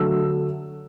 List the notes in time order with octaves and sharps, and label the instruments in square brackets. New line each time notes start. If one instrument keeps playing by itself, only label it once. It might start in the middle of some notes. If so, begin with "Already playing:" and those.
Already playing: [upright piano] D3 F#3 A3 E6